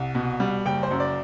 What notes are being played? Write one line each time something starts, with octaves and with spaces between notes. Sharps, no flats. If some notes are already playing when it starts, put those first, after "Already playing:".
Already playing: C2 F#5
B2
G3
F#1 G5
C5
F#2
D5